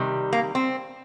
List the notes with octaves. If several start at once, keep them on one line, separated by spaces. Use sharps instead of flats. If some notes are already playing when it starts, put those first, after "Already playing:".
Already playing: C3 D#3 G3
A#3
C4